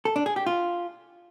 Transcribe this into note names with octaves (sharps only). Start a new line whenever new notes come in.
A4
D4
G#4
G4
F4